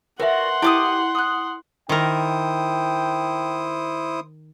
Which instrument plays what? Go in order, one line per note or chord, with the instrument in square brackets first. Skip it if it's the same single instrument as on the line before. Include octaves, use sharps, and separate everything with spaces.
[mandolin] F#4 D5 [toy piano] A#4 B4 E5 [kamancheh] F#5 C6
[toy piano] E4 D#5 [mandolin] G4 D6 D#6
[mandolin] D#6 F#6
[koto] D#3 A#4 [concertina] E4 C5 D#6 [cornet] G5